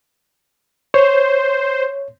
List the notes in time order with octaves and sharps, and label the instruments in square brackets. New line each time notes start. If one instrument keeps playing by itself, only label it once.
[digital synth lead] C5 [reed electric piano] C#5